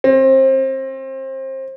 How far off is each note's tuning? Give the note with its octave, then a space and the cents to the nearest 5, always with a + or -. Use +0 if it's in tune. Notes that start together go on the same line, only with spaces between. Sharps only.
C4 +25